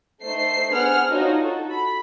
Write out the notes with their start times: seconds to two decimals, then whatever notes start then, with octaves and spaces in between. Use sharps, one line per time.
0.23 A3 D#4 C5 C7
0.71 B3 D4 G#4 C5 F#5 F6
1.09 D4 D#4 F4 F#4 C#5
1.39 F#4 A4
1.71 B5